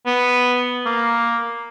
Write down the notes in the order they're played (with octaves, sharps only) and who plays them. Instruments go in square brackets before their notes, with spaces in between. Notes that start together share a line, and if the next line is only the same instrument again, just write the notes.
[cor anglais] B3
A#3